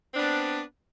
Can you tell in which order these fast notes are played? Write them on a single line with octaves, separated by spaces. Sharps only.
C4 D4 B3